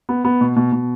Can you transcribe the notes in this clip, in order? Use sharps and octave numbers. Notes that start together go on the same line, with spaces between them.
B3
B3
B2
B2
B2